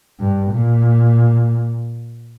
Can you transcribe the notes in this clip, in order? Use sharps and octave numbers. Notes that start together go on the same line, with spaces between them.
G2
A#2